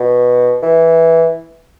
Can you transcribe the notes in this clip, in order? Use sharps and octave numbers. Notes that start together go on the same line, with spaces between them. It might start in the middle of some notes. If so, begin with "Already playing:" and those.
Already playing: B2
E3